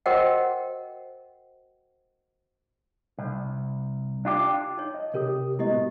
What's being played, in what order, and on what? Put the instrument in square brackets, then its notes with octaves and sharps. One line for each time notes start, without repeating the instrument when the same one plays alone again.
[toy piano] F#4 A#4 C5 D#5 F#5 G5
[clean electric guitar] C2
D4 F4 G4
[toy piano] D#4 C#5
[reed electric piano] D#5
[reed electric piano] C3 G4 D#6 [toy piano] A#4 C#5
[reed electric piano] G#3 B3 [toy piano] E4 G4 D#5
[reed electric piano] A2 F#4